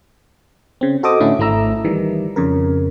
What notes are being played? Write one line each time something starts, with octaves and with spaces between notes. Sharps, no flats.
C#3 C4
F#4 A4 C5 D#5 D6 D#6
A2 D3 C#4 E4
G#1 A3 E4 A#5 E6
D#3 E3 G3
F2 C#3 A#4